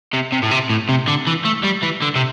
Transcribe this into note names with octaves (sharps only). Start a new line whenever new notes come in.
C3
C3
A2
C3
A2
C3
D3
E3
A3
G3
E3
D3
C3